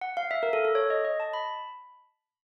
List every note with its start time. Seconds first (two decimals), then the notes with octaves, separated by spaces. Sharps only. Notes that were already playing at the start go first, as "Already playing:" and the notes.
0.01 F#5
0.17 F5
0.31 E5
0.43 A#4
0.53 A4
0.65 A4
0.75 C#5
0.90 D#5
1.05 D#5
1.20 A5
1.34 B5